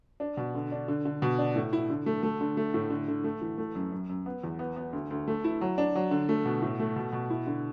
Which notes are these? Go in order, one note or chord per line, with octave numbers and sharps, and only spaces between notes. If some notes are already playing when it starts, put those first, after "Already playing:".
D4
B2
D3
D4
D3
D3
B2
D4
A2
E4
D3
A3
A3
D3
A3
A2
D3
D3
A3
E3
A3
F#2
F#2
F#2
B3
E2
B3
B3
D2
D2
A3
E4
F#3
D4
F#3
D3
A3
B2
A2
A3
B2
B2
E4
D3